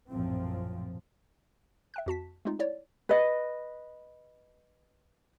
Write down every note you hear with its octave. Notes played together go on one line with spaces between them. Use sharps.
A#1 F#2 A2 F3 C4
E5 G5 F#6
F2 F#4 A5 B6
G#3 A3 C4 D#4 F4
E4 C#5 D5
B4 D#5